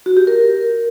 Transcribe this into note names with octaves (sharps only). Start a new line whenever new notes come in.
F#4
G4
A#4